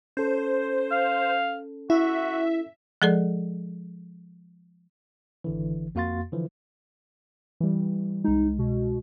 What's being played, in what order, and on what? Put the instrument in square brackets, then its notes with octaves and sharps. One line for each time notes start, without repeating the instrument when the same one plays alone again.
[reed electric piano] C#4 A4 [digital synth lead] C5
[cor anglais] F5
[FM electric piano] E4 [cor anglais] F#4 [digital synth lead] E5
[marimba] F3 G#3 G#4 A4 D5
[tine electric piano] G#1 D3 E3
F2 A#3 F#4 F5 C6 A6
D3 E3 F3
[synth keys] E3 G3
[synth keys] C2 G#3 [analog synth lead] D#4
[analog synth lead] B2